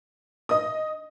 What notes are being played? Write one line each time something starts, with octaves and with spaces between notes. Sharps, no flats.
D#5 D#6